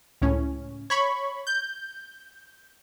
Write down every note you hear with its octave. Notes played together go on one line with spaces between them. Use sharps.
C#2 A2 C#4
C#5 B5 C#6
G6